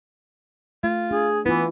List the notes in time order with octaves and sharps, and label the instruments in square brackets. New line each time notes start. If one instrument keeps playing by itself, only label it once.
[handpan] A3 [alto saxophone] F4
[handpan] D4 [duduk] G#4
[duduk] E3 [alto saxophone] B3 [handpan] E4 F4